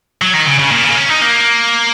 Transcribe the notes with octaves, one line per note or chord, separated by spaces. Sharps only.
F#3
D#3
C#3
C#3
A#2
C#3
A#3
C#4
D#4
A#3